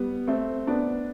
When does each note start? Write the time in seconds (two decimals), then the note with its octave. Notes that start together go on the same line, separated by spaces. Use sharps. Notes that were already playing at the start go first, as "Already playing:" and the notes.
Already playing: G3 B3
0.27 A3 C4
0.67 B3 D4